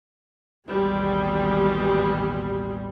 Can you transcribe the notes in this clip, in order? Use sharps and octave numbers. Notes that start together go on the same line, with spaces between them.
A1 D#2 B2 G3 G#3